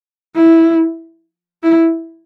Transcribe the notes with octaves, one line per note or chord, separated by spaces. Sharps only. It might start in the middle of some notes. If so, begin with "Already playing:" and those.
E4
E4